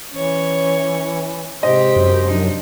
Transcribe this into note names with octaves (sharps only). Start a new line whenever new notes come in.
E3 C#4 C#5
G#2 C3 G4 C5 D#5
F#2
F3 D4 D#4